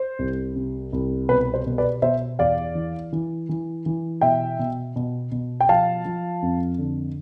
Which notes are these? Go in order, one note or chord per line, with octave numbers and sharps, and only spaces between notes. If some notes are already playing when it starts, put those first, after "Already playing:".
Already playing: C5
C2
C3
C2
B2 B4
C5
B2
B4 D5
B2 C5 E5
E2 D5 F5
E3
E3
E3
E3
B2 E5 G5
B2
B2
B2
G5
F3 F5 A5
F3
F2
D3